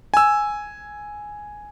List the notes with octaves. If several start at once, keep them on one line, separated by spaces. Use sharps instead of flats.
G#5 E6